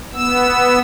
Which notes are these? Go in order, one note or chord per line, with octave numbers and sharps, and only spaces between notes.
B3 E6